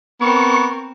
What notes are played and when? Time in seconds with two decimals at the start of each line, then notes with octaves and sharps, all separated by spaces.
0.21 B3 C4 A#4 C#6